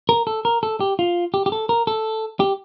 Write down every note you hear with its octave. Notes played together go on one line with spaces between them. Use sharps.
A#4
A4
A#4
A4
G4
F4
G4
G4
A4
A#4
A4
G4